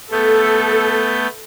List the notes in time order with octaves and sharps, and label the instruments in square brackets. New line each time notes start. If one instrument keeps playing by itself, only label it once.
[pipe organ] A3 B3 G6 [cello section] A4